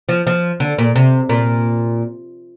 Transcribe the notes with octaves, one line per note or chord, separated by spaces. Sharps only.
F3
F3
D3
A#2
C3
A#2